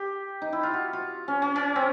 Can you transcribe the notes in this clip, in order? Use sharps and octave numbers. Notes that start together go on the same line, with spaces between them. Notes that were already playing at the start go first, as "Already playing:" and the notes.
Already playing: G4
D#4
E4
F4
F#4
F4
C#4
C#4
C#4
C4